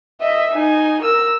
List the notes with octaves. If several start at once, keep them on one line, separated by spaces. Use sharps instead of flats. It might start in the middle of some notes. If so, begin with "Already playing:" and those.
D#5 E5
D#4 G#5
A#4 E6